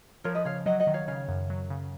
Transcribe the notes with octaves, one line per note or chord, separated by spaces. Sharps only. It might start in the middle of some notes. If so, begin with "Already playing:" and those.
F3 A#4 C#5
B4 D#5
C#3 C#5 F5
F#3 D#5 F#5
D#5 F#5
D#3
C#5 F5
C#3 C#5 F5
F#2
F#3
C#3